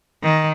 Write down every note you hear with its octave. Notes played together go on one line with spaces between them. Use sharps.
D#3